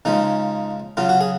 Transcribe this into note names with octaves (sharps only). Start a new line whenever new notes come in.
C#3 F3 G#3 D#4
C#3 F#3 F4
F#4
G#4